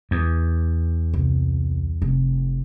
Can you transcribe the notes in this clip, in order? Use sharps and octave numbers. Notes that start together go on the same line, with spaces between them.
E2
C2
F1